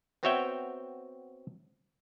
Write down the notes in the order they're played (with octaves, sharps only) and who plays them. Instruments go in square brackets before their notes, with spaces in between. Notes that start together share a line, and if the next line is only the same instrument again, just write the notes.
[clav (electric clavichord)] B3 C4 F#4 C#5 E5 G5